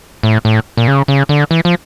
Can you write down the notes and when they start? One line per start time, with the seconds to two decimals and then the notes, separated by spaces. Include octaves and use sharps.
0.23 A2
0.45 A2
0.77 A#2
0.88 C#3
1.08 C#3
1.29 D3
1.51 E3
1.65 F3